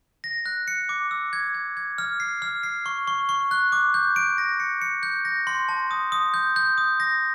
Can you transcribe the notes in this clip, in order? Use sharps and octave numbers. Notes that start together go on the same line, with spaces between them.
A#6
F#6
C#7
D6
E6
G#6
G#6
G#6
F6
C7
F6
C7
C#6
C#6
C#6
F#6
D6
G6
D7
A#6
C#7
C#7
G6
A#6
C6
A5
D#6
D#6
G6
G6
D#6
A#6